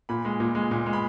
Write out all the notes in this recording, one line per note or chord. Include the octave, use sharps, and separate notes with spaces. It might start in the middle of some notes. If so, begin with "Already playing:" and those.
A#2 B5
G#3
A#2
G#3
A#2
G#3
B5